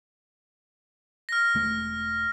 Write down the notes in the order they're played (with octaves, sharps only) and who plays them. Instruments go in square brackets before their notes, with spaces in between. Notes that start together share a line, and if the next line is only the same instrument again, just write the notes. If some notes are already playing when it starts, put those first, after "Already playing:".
[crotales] F6 A#6
[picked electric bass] E1 A3